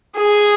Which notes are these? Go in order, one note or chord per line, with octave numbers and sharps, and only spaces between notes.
G#4